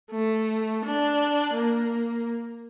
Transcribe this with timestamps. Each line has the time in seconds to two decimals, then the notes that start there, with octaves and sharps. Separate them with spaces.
0.11 A3
0.85 D4
1.55 A#3